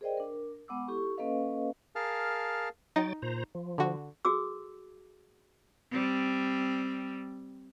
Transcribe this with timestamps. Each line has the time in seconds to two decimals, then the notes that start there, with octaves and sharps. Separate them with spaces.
0.01 G#4 A#4 C5 D5 D#5 G5
0.17 D4 A#4
0.68 G#3 B3 F#5 D6 E6
0.88 E4 G4 A4 C#6
1.17 A#3 C#4 A4 B4 D#5 F5
1.96 G#4 A#4 F5 A5 F6
2.96 F#3 D#4 G5 A6
3.22 A#2 C5 A#5
3.55 F3
3.78 D3 F#4
4.25 F#4 G#4 A4 D6 E6
5.92 G3 C4